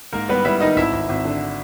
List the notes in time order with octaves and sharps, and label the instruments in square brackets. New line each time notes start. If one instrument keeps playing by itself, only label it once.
[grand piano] G#2 A#3 A#4
G3 B3 B4
G3 E4 E5
D#3 D#4 D#5
G#1 E4 E5
G#1
G#1
D3